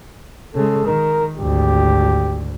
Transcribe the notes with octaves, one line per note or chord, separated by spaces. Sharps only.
C#3 G#3 A4
D#3 A#4
G#1 D2 G4